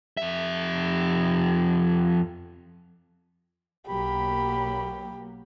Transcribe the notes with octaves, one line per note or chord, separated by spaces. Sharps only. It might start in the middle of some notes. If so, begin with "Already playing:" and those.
F2 E5
B1 F#3 A#3 G4 B5